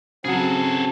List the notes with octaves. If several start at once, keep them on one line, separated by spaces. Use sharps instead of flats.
C#3 F#3 C4 F#4 G#4 A4